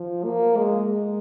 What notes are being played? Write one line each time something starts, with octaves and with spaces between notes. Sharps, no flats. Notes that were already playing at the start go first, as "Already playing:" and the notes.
Already playing: F3
A#3
G#3